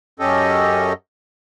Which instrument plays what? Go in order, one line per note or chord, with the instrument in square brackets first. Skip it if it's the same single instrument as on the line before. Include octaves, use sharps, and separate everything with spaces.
[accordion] F#2 C#4 G4 A4 D#5